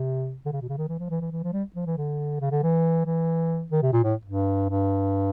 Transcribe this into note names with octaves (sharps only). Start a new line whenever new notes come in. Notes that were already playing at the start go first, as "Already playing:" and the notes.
Already playing: C3
D3
C#3
B2
C#3
D#3
E3
F3
E3
E3
E3
F3
G3
F3
E3
D3
C#3
D3
E3
E3
D#3
C3
A#2
A2
G2
G2